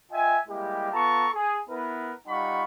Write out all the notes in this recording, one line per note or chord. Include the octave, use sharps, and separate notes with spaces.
F4 D#5 E5 G5 G#5
G3 G#3 A#3 E4 G4
B3 F4 A4 A5 A#5 C#6
G#4
B3 E4 A#4 B4
G3 D#4 F4 F#5 B5 C#6